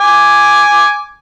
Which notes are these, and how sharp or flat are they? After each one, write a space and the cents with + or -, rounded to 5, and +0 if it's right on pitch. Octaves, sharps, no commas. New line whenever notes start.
G#5 +0 D6 +0